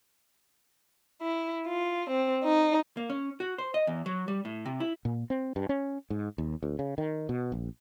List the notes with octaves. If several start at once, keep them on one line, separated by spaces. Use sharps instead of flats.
E4
F4
C4
D#4
A#3
C#4
F#4
C5
D#5
E2
F#3
G3
A2
C3
E4
A#2
C4
G2
C#4
G#2
D#2
D2
C#3
D#3
B2
A#1